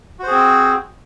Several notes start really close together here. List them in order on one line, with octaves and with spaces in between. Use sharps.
F#4 C5 G#4 C4